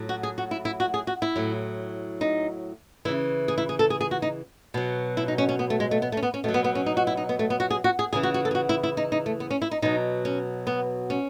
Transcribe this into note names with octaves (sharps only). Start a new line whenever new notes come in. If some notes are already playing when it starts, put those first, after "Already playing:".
Already playing: A2 F#3
F#4
G#4
F#4
E4
E4
F#4
G#4
F#4
E4
A2 F#3
D#4
C#3 E3 E4
G#4
E4
G#4
A4
G#4
G#4
F#4
D#4
B2 F#3
E4
D#4
C#4
C#4
B3
A3
G#3
A3
B3
A3
C#4
B3
C#4
B2 F#3 A3
B3
B3
C#4
D#4
F#4
E4
D#4
B3
A3
B3
F#4
G#4
F#4
G#4
C#3 E3 G#4
F#4
F#4
A4
G#4
F#4
E4
E4
D#4
D#4
A3
B3
C#4
E4
D#4
B2 F#3 D#4
C#4
B3
C#4